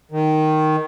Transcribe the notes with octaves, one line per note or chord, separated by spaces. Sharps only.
D#3